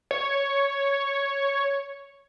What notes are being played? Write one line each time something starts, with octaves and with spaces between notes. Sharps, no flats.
C#5